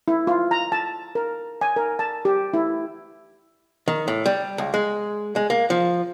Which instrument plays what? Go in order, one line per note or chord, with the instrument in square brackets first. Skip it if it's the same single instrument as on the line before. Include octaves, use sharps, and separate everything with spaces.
[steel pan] E4
F4
A#5
A5
A#4
G#5
A#4
A5
G4
E4
[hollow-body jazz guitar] D#3
A2
G3
C#2
G#3
G#3
A#3
F3